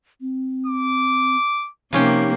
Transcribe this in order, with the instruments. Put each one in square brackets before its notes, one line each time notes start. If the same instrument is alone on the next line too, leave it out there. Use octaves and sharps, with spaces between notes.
[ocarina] C4
[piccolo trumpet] D6
[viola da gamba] C3 A#3 [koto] F3 C#4 G4 [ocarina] D#4